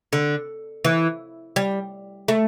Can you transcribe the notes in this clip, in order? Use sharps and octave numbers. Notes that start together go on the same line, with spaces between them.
D3
E3
G3
A3